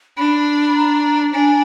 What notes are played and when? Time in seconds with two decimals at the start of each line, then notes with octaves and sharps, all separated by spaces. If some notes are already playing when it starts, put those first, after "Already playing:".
0.17 D4 B5
0.75 A#5
1.34 D4 G#5